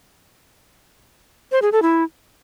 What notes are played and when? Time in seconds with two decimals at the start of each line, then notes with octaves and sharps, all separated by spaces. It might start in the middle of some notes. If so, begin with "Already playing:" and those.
1.52 C5
1.62 G#4
1.72 A4
1.82 E4